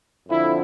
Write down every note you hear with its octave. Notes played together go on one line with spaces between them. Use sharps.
F2 D3 F3 E4